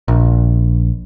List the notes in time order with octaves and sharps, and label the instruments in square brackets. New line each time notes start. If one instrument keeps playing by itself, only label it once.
[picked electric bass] A#1